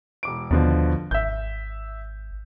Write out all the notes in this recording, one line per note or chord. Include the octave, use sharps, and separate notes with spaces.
E1 D6 D7
D#2 B2 D3 F3
G#1 E5 G6